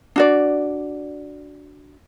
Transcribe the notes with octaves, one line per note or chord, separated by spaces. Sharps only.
D4 F#4 D5